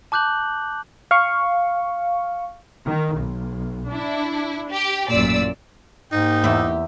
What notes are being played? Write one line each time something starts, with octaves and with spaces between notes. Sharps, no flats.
A5 D6 F#6 G6 F#7
F5 C#6
D#3
B1
D4 E4
G4
A1 F#2 A#2 D5 E6
G#2 A#3 D#4 G4 G5
E2 E4